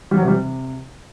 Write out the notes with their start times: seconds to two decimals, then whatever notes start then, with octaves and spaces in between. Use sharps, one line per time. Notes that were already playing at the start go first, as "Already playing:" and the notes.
0.11 G3
0.17 F#3
0.22 C3
0.28 G3
0.33 C3